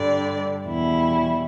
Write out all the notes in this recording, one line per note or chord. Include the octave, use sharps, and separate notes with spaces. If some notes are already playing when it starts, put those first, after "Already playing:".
Already playing: G2 D3 G3 D5
E2 B2 G3 E4